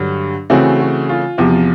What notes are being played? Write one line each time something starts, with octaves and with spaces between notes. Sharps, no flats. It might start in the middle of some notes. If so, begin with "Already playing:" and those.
Already playing: G2 D3 F#3
C#3 E3 A3 C4 F#4
F#4
F4
E2 C3 F3